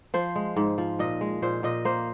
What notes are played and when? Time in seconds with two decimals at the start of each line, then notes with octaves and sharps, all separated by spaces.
0.14 F3 C5
0.36 G#3
0.56 G#2
0.78 F3
0.99 A#2 D#5
1.21 G#3
1.42 A#2 C5
1.63 A#2 D#5
1.85 A#3 C5